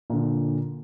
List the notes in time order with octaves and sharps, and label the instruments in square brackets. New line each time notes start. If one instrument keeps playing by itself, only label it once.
[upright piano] A#2 D3